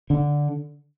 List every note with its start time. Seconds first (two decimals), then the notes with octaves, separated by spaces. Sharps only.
0.10 D3